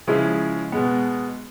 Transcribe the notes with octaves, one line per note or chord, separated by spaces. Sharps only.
C#3 F3 G#3 C#4 E4
B2 G#3 B3